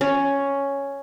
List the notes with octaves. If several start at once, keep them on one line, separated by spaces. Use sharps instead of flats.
C#4